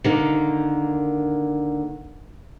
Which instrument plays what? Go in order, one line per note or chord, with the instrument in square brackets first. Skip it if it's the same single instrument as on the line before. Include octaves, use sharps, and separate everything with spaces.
[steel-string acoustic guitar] D3 D#3 A#3